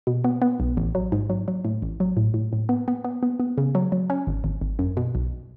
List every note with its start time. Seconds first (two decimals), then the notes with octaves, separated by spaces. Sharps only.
0.07 B2
0.24 B3
0.42 B3
0.60 B1
0.77 A1
0.95 F#3
1.12 G#2
1.30 F#3
1.48 F#3
1.65 A2
1.82 A1
2.00 F#3
2.17 A2
2.34 A2
2.53 A2
2.69 B3
2.88 B3
3.04 B3
3.23 B3
3.40 B3
3.58 C#3
3.75 F#3
3.92 F#3
4.10 C#4
4.27 G#1
4.44 G#1
4.61 G#1
4.79 F#2
4.97 B2
5.15 B1